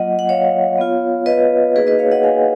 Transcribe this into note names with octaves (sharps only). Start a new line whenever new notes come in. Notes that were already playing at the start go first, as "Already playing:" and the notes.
Already playing: F#3 A#3 F4 D#5 F#5
F#5
C#5 F5
B3 F4
B4 D#5
A#3 D#4 F#4 G#4 B4
B4 D#5
C#5 F5
D#5 F#5
F5 G#5